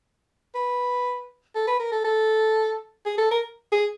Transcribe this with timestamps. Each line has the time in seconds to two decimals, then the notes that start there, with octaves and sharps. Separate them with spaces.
0.55 B4
1.55 A4
1.67 B4
1.80 A#4
1.92 A4
2.05 A4
3.06 G#4
3.18 A4
3.31 A#4
3.72 G#4